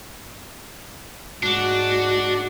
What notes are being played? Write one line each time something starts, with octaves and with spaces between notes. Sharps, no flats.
G#2 D4 F#4